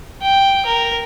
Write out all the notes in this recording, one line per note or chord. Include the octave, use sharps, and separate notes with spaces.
G5
A#4